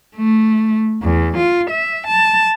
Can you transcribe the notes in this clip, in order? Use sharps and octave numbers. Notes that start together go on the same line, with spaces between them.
A3
E2
F4
E5
A5